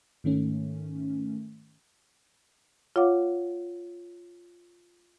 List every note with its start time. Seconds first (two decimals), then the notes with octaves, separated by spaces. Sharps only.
0.24 G#2 D#3 A3 C#4
2.96 F4 C#5 F5 F#5 D6